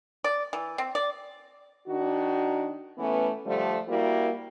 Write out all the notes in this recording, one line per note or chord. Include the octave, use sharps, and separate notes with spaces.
D5
E3
C4
D5
D#3 D4 F#4
E3 A3 B3 C#4
D3 F3 G3 A3
G3 A#3 E4 F#4